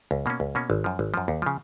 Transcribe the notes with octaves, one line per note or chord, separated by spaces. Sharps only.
C#2
B2 A#3 C#4
C#2
B2 A#3 C#4
G#1
F#2 F3
G#1
F#2 F3
D#2
C#3 F3